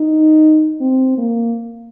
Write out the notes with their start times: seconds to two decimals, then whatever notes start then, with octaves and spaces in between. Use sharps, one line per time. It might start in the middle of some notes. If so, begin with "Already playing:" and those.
Already playing: D#4
0.81 C4
1.18 A#3